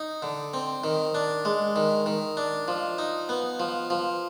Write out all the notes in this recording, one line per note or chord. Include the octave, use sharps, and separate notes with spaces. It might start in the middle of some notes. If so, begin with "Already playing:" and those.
Already playing: D#4
D3
C4
D#3
D4
G#3
D#3
D#3
D4
F3
D#4
B3
F3
F3